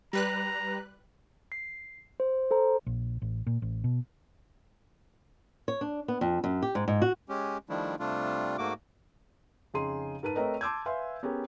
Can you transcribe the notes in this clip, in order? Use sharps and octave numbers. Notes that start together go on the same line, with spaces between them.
G3 B4 A#5 F#6
C7
C5
A4 C5 A#5
A#1
A1
A#2
A1
B2
C#5
D4
B3
F2
F#2
G4
G#2
G#2
F#4
G#3 C#4 G4
D#3 F3 G3 A3 D4 E4
C3 G3 A3 D4 F4
G#2 A3 A#3 F#4 D6
F2 C#3 D#4 G#4 C6 D#7
G#2 A#4 B4 A5 D#7
A3 C4 A#4 B4 C#5 D#5
A5 C6 D6 E6 G6 G#6
B4 E5 F5 G#5 C6
B3 C#4 G4 G#4 A#4